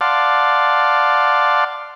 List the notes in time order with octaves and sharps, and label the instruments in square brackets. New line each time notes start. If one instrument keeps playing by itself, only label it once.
[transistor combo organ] D5 F5 F#5 A5 C6